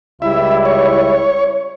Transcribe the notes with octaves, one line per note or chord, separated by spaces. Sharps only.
C#2 G3 E4 E5
C#5